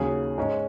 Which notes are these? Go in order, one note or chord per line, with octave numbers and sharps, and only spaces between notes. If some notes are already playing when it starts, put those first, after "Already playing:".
Already playing: D#2 C#3 F#3 C#4 G#4
G#2 G#3 C#4